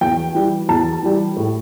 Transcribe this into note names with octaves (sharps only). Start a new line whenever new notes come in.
E2 G5
E3 G3
E2 A5
E3 G3
A2